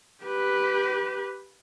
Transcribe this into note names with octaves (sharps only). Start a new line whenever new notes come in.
G4 B4